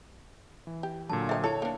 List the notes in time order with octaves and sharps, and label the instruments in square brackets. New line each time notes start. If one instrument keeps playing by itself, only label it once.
[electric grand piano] E3
[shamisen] G4
[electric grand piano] A#2 D3 F#3 [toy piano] A5
[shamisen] F3 A#4 D#5 [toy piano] E5 G5
[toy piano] E4 A5 [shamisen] A4 [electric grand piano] C#5
[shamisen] A#3 D4